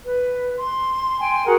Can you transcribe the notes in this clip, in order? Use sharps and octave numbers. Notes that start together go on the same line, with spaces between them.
B4
C6
G5 G#5 C6
F#4 G#4 A#4 F#5